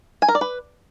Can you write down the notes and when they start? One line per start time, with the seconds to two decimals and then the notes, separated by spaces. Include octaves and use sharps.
0.22 G#5
0.28 A#4
0.35 D5
0.41 B4